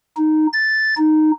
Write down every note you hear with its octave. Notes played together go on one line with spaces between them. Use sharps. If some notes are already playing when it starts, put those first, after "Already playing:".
D#4
A6
D#4